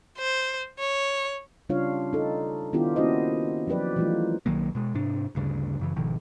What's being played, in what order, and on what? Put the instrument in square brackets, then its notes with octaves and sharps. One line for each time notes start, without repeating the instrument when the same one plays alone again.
[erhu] C5
C#5
[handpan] C#3 G3 D4 F4 C#5 F5
D#4 A4
D#3 B3 D4 E4 F4 G4
A#3 C#4 E4 F#4 C5 D#5
F3 F#3 G4 B4 D5
E3 F3 G3 A3 D#4 F4
[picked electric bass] B1 D#3 F#3 A#3
B2 G#3
G#2 C3 D4
D2 G2 C#3
F#2 C#3 E3
G#1 B2 D#3 F3